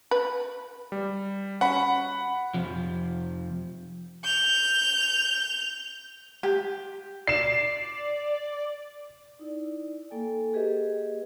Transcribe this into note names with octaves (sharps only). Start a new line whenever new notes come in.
B4
G3
C#4 F#4 F#5 B5
F2 C3 F3
G6 F7
G4
D5 C7 E7
D#4 E4 D5
A#3 A4 G5 G#5
A#3 G4 G#4 B4 D#5 E5